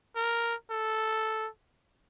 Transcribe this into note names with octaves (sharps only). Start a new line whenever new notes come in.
A#4
A4